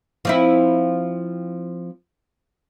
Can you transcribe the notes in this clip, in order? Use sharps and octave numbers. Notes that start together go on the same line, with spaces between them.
F3 C4 E4